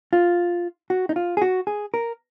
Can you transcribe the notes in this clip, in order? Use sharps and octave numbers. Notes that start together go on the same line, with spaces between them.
F4
F#4
D#4
F4
G#4
F#4
G#4
A#4